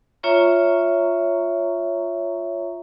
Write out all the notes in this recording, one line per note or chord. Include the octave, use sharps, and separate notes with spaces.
F4 C#5 E5 A#5 C#6